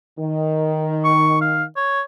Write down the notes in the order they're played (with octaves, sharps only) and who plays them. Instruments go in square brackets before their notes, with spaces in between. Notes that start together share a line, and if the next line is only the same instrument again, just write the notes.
[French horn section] D#3
[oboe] C#6
F5
C#5